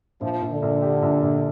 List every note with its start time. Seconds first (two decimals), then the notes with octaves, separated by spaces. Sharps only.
0.21 A#1 F3
0.41 A#1
0.52 D3
0.62 A#1
0.82 G4
1.02 A#1
1.22 A#1